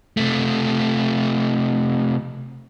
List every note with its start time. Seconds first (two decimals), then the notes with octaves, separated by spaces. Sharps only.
0.17 C3 A3